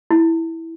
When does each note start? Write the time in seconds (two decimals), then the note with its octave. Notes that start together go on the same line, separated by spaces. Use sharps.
0.11 E4